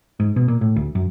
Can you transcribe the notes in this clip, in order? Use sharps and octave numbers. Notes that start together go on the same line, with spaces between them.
G#2
B2
A#2
A2
D2
F#2